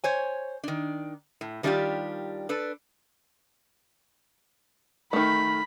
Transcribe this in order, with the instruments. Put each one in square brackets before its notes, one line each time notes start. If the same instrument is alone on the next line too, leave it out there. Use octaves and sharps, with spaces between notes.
[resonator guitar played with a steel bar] C5 C#5 G#5
D#3 D4
A2
D#3 G3 D4 D#4 F4 G4
D4 A4 B4
[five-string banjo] D#3 A3 [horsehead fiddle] B5